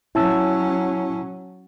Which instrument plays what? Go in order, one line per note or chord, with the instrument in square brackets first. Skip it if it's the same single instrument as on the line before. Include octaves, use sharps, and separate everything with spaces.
[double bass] F#3 C#4 [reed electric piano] E4 A5 E6